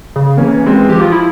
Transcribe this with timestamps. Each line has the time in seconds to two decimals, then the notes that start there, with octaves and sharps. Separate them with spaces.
0.16 C#3
0.37 E3 A#3 C#4
0.66 G#3 C4
0.89 G4
0.95 F3
1.01 F4
1.12 E4